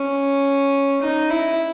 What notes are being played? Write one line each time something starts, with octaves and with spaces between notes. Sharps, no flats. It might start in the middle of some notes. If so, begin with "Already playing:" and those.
Already playing: C#4
D#4
E4